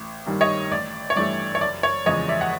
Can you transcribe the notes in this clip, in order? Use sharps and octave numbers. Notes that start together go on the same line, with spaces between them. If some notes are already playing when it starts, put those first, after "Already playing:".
Already playing: A1
G2 D#3 G3 A#3
C#5 D#5
A1 D5
C#5
G2 E3 A3 D5
C#5
F#1 D5
C#5
E2 C#3 F3 G#3 C#5 D#5
D5 E5
F#5